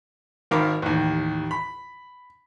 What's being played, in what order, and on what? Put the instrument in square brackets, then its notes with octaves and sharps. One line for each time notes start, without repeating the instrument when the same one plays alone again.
[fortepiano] G#1 D#3 A#4 F5 B5 D6
A1 D#2
B5